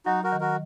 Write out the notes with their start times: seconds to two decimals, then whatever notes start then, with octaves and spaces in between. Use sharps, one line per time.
0.06 F#3 D#4 F#4
0.24 F#4 A#4
0.32 D#3
0.40 F#4 A#4